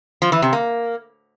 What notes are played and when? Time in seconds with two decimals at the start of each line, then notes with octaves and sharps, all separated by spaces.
0.22 F3
0.32 E3
0.42 C3
0.53 A#3